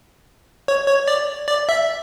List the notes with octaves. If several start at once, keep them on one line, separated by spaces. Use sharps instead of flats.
C#5
C#5
D5
D5
E5